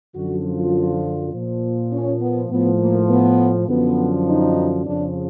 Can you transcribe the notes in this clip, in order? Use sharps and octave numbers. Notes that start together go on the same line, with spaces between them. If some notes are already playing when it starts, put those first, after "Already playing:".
F#2 D3 F3 F#4
F4
A#2 F3
C#4
B3
A2 F3 B3
A#3
B3
F#2 D3 F3 B3
D#4
F2 C#3 F3 D4